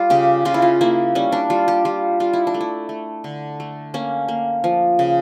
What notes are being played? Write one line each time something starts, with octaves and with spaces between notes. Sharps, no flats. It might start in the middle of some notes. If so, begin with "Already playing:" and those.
Already playing: G3 F4
C#3 G4
C#3 F4
E4
F4
A#3 E4
G3 C#4
D4
G3 F4
G4
G3 F4
G3 F4
E4
D4
A3
E4
A3
D3
A3
A#3 C#4
A#3
F3
C#3